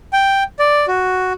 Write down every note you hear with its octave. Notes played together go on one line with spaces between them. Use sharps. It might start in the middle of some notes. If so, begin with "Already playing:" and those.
G5
D5
F#4